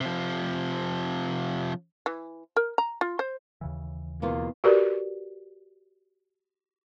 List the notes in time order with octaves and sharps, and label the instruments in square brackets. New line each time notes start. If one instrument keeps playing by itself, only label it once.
[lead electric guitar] C3 F3
[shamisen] E3
A#4
A#5
F4
C5
[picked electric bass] D#2 C#3 E3
[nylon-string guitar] E2 B2 F4 [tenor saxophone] A#3
[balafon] F#4 G4 A#4 B4 D5